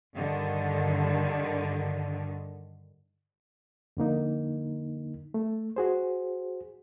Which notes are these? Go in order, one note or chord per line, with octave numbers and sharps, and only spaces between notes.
G2 D3 D#3
F2 D3 A#3 D#4
A3
F#4 G#4 C5